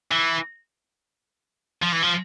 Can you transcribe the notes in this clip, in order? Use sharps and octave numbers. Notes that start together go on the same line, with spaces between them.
E3
F3
E3
F3